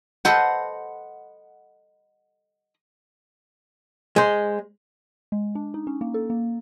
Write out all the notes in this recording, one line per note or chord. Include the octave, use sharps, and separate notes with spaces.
A4 B4 C5 D#5 F#5
G#3 C5
G#3
D4
D#4
C#4
A#3
A4
A#3